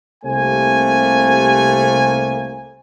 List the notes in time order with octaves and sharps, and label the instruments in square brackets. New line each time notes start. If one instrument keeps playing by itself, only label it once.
[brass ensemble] C2 C3 A3 A#3 C5 G#5